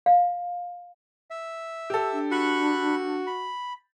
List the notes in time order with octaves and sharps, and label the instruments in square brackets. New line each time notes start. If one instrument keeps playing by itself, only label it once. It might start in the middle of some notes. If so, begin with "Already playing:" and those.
[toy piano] F5
[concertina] E5
[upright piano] G4 A4
[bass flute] D4
[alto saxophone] F#4 [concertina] B5 C#6 F#6
[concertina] B5